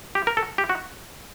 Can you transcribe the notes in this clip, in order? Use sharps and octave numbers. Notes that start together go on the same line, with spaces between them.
G4
A#4
A4
G4
F#4